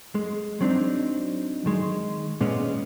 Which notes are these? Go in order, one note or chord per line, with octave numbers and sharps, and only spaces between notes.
G#3
F#3 C4 D4 D#4
D#3 G#3
A#2 G#3 B3 C#4